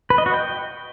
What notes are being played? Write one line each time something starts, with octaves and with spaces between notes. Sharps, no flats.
B4
D#5
F#4
G5